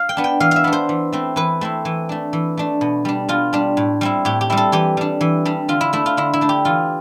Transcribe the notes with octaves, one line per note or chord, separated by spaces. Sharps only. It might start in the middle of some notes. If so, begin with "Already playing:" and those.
Already playing: F5
G5
B3 D4
G5
E3 F5
E5 F5
B3 D4
C5
E3
A3 C4 E4
E3 B4
A3 C4 E4
E3
A3 D4
E3
A3 D4
B2
G3 D4
B2 F4
G3 D4
A2
G3 C4 E4
A2 G4
G4
G3 C4 E4
A4
E3 G4
G3 D4
E3
G3 D4
D3 F4
E4
A3 D4 E4
F4
D3 E4
E4
A3 D4
G4
E3 F4